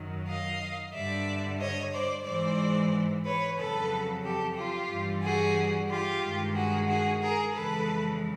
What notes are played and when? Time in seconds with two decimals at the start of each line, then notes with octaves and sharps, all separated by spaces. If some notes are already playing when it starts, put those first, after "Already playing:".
Already playing: F#2 D#3 F#3
0.27 D#5 F5
0.93 G2 D3 G3 D5 E5
1.59 C#5 D#5
1.92 C5 D5
2.25 G#2 E3 G#3 C5 D5
3.24 B4 C#5
3.57 F2 C#3 F#3 A4 B4
4.23 G4 A4
4.56 F4 G4
4.89 G2 E3 G3
5.22 F#4 G#4
5.89 F4 G4
6.22 G2 D#3 G#3
6.54 F#4 G#4
6.87 F#4 G#4
7.20 G#4 A#4
7.53 F2 C#3 E3 G#3 A4 B4